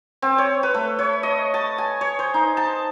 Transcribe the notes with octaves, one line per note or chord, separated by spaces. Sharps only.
C4
C#5
B4
A3
C#5
D#5
A5
G#5
C#5
C5
D#4
A5